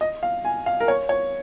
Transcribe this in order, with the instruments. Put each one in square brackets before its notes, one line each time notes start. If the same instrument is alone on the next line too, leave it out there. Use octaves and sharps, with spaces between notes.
[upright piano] D#5
F5
G#5
F5
A#4
C#5
C#5